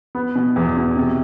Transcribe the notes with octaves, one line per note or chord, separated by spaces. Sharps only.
B3
B2
E2
B2
C3